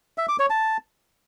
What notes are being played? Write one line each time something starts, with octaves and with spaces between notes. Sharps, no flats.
E5
D6
C#5
A5